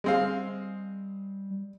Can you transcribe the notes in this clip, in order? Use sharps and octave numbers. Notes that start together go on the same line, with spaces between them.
G3 G#3 C4 F5